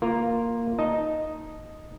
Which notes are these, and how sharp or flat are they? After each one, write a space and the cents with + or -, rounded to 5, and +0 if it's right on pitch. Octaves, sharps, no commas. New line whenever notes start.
A#3 +0 F4 +0 A#4 +0
D#4 +0 D#5 +0 A5 -5